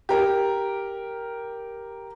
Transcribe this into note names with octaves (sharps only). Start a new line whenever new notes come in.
G4 A#4